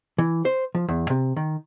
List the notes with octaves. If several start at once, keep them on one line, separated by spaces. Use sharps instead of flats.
E3
C5
F3
E2
C3
D#3